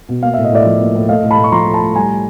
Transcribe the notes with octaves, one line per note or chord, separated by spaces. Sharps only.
B2
A#3 F5
A2 E5
D#5
A2 D5 E5
F3
A#3
A2
A3 D#5 F5
A2
A5 B5
A2
C#6
F3 A#5 C6
A3
A5 B5
A2
G3 G#5 A#5